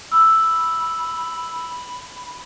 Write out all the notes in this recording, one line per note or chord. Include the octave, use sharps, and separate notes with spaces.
B5 E6